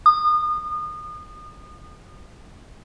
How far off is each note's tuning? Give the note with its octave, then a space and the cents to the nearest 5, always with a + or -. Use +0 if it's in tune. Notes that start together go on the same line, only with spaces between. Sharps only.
D#6 -35